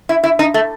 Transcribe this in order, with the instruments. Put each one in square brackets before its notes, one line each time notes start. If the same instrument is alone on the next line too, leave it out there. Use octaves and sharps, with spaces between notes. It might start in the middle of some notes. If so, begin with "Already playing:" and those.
[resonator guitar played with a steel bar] E4
E4
D#4
A3